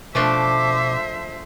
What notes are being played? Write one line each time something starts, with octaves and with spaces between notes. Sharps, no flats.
B2 F3 A3 D4 C5 E5 D6